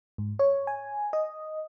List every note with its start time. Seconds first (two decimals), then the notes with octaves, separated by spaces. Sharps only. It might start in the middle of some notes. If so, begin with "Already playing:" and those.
0.18 G#2
0.39 C#5
0.67 G#5
1.13 D#5